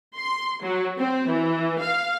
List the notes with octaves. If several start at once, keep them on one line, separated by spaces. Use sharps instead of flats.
C6
F#3
C4
E3
F5